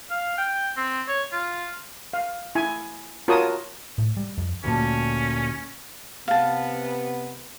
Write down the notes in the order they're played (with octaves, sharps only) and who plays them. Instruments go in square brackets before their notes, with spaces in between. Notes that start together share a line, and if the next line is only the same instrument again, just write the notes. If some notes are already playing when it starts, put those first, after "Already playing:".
[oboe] F5
G5
C4
C#5
F4
[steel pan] F5
E4 G#5
F4 F#4 A#4 C#5 A5 D#6
[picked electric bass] A2
G3
F2
[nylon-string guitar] D2 A#2 A5 [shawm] C#4
[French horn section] C3 B3 [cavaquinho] F5 A5